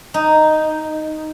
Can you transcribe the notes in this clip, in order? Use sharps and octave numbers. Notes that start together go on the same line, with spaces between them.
D#4